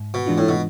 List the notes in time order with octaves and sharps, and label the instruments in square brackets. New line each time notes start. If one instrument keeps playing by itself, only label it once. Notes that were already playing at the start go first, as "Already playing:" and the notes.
Already playing: [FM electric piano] G#2
[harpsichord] B2
[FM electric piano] E3 G#3 D4 F4
[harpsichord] A2
B2